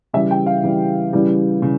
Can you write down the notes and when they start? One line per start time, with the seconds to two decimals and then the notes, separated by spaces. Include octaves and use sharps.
0.13 C#3 E3 G3 E5
0.31 G5
0.46 F5
0.63 C#3 E3 G3
1.13 C#3 E3 G3
1.62 C#3